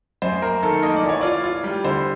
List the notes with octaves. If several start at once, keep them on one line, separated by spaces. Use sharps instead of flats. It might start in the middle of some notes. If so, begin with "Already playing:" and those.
F#2 C5
A#3 A#4
D#3 A4
A#3 D#5
D5
E3
C#5
F4 D5
F4
G3
D3 C5